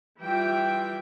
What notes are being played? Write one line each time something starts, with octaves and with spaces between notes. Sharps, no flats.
E3 G3 F4 E5 G5